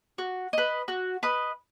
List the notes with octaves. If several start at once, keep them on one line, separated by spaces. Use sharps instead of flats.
F#4
B4 D#5
F#4
B4 D#5